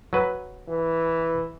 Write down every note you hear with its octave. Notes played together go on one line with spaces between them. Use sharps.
F#3 B4
E3